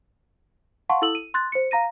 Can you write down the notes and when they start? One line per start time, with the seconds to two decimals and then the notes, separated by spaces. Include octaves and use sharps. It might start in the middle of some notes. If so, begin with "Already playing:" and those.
0.89 F5 F#5 A5 C6 C#6
1.02 E4 A4 E6 F#7
1.15 D#7
1.34 C6 F#6 A6
1.52 C5 C#7
1.71 F5 A#5 A#6 D#7